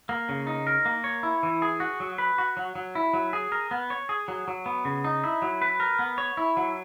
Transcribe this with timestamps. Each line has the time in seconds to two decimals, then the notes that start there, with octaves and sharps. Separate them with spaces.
0.09 A#3
0.29 C#3
0.47 D#4
0.67 A#4
0.85 A#3
1.04 C#5
1.23 E4
1.43 E3
1.62 G#4
1.80 F#4
2.00 F#3
2.18 B4
2.38 F#4
2.57 F#3
2.75 F#3
2.95 E4
3.13 F#3
3.33 G#4
3.52 A#4
3.71 B3
3.90 C#5
4.09 G#4
4.28 F#3
4.48 F#3
4.66 B3
4.85 C#3
5.04 D#4
5.24 E4
5.42 F#3
5.62 B4
5.80 A#4
5.99 B3
6.18 C#5
6.37 E4
6.57 F#3